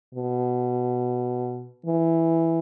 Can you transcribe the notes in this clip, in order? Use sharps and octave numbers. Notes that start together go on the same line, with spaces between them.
B2
E3